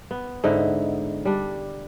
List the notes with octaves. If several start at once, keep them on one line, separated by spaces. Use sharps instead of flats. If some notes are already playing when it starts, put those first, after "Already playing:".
B3
G#2 D3 D#4 E4
G3 D4